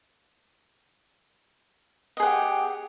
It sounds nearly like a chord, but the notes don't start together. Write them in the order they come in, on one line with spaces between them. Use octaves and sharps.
D#5 G#4 F#5 G4